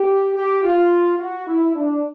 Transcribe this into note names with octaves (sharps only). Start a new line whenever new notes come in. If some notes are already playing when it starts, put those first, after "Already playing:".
Already playing: G4
G4
F4
F#4
E4
D4